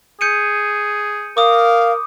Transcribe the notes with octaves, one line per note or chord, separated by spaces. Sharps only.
G#4 G6 C#7 D#7
A#4 F5 D6 D#6